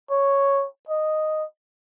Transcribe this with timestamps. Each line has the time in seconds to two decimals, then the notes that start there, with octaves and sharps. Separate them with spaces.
0.10 C#5
0.89 D#5